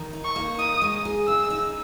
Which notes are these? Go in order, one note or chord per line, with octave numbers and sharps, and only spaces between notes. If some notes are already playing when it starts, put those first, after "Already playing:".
Already playing: D#3
D#4
C#6
A#3
D#4 D#6
G#3
G#4
C#3 E6
D#4